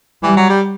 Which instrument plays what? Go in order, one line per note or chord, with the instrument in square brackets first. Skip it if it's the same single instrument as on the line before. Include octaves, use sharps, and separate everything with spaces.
[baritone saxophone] E3 [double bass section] G3
[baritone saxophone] F#3
G3